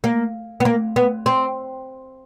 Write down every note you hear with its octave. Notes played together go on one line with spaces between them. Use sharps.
A#3
B3
A#3
B3
C4